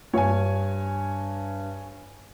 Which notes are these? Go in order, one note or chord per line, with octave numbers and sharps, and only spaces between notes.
G2 C#5 G#5